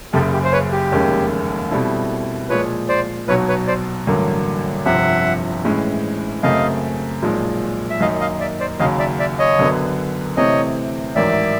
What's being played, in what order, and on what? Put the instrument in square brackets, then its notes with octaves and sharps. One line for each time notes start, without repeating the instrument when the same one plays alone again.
[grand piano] F#1 F#2 C#3 [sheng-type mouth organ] G4 A4
[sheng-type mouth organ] G4
C5
B4 C#5
G4
[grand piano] F1 D#2 D#3 G#3 C#4
B2 G3 C4 E4 A4
[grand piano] A#2 F3 G#3 [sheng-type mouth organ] B4 C#5
[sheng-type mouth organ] C5 D5
[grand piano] B1 B2 F#3 [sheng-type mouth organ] B4 C#5
[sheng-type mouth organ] B4 C#5
C5 D5
[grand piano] A1 G2 D3 F#3 A#3
[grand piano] G1 F2 C3 F3 [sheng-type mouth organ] E5 F#5
[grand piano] A2 E3 G#3 C#4
[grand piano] F#2 C#3 F#3 A3 C4 [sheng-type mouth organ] D#5 F5
[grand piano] B1 A#2 F3 G#3
[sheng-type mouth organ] E5
[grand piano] F#2 D#3 F#3 A#3 D#4 [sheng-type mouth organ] D#5 F5
[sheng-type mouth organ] D#5 F5
D5 E5
C5 D5
[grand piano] D#2 C#3 F#3 [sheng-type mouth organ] D#5 F5
[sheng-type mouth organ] D5 E5
D5 E5
C#5 D#5
[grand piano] F#2 D3 F#3 B3
[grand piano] C3 E3 A3 C4 [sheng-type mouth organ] C#5 D#5
[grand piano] A1 G#2 D#3 F#3 [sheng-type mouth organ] D5 E5